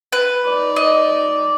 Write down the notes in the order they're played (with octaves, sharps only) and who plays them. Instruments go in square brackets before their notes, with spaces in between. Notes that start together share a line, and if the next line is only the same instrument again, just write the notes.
[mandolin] B4
[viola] D#4 D5
[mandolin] D#5